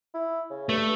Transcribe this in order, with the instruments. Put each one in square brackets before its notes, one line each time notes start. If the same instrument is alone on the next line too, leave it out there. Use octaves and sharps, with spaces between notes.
[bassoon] E4
C#3
[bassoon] G2 [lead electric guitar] A3